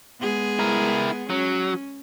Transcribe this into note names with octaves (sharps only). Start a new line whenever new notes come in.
G#3 B3 G#4
E4 A#4
F#3 C#4